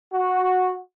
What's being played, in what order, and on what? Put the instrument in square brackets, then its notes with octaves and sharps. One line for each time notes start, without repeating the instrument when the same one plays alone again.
[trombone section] F#4